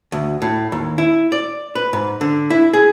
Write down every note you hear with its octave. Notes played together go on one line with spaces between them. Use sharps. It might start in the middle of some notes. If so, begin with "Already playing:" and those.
D2
A2
D#2
E4
D5
B4
G#2
D3
E4
G#4